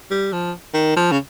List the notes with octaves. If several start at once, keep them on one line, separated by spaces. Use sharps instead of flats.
G3
F3
D#3
F3
C#3